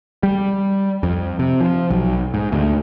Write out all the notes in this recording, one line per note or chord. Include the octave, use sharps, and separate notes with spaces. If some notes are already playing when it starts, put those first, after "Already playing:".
G3
F2
C3
F3
B1
G#2
D2